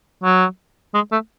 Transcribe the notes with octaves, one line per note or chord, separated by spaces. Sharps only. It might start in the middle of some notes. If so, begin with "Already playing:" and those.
F#3
G#3
A3